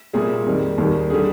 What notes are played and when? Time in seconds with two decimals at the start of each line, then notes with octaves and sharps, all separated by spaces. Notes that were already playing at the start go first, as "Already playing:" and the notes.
0.13 C2 A#2 G3 G#4
0.46 F2 D#3 G3
0.78 D#2 D#3 G3
1.10 D3 G3 G#4